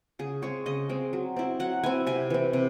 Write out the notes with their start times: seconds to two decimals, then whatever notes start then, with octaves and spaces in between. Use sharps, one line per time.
0.19 C#3 G#4
0.42 G#3 C4 C#5
0.66 C#3 D#5
0.89 G#3 C4
1.13 F#3
1.36 C4 E4
1.60 F#3 F#5
1.83 C4 E4 G#5
2.07 C3 G#5
2.30 E3 C4
2.53 C3